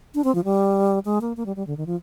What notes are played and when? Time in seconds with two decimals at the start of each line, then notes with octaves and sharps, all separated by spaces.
0.15 D4
0.24 C4
0.35 F3
0.44 G3
1.05 G#3
1.21 A#3
1.37 A#3
1.46 G3
1.56 G3
1.67 D3
1.77 D#3
1.86 F3